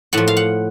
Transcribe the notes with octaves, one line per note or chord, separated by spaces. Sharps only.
A2 F3 F#5
F5
F#5